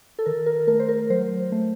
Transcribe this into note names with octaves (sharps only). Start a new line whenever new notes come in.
A4
D#3 A#4
A#4
A3 A#4
C5
A#4
F#3 C5
A3